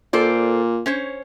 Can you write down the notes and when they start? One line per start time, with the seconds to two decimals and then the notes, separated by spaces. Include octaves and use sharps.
0.13 A#2 A4 C5 D5
0.86 C#4 C5 C#5